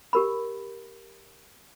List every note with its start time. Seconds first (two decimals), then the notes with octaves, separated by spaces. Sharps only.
0.13 G4 A#4 B5